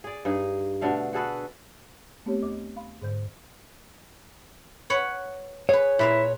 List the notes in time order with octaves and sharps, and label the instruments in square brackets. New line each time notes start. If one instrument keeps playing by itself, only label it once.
[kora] G#4 D5
G2 D#4 G#4
B2 D3 A3 F5
F#4 G#4 A4 B4
[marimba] A3 B3 C4 G4 C#5
D2 D#5 D6
F5 B5 C6
G#2 D3 C5 G6
[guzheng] B4 C#5 F#5
[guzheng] G#4 B4 [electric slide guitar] C#5
[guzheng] A#2 B4 F5 [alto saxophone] E4